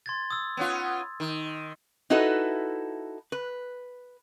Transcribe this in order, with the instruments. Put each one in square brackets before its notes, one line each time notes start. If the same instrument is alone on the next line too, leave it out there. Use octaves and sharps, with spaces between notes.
[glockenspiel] C6 G#6 A6
D#6 E6
[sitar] B3 C#4 F4
D#3
[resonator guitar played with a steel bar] D#4 E4 F#4 A4 B4
B4